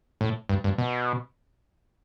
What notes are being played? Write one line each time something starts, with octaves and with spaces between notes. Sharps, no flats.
A2
G2
G2
B2